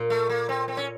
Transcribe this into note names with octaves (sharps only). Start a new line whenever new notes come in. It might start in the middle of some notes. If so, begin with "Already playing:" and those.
Already playing: A#2
A3
A#3
C4
C4
C#4